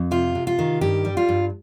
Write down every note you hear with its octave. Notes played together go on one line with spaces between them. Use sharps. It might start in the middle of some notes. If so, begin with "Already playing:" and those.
Already playing: F2
C3 F4
C3
F4
D#3
G2 G4
G3
F4
G2